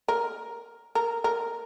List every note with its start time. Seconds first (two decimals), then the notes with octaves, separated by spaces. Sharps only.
0.08 A#4
0.95 A#4
1.24 A#4